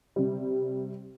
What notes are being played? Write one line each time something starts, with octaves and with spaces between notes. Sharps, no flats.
C3 G3